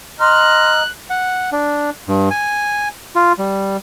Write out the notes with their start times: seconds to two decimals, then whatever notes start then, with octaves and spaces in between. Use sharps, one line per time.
0.20 D#5 A#5 C6 F6 F#6
1.10 F#5
1.52 D4
2.08 G2
2.31 G#5
3.16 F4
3.39 G3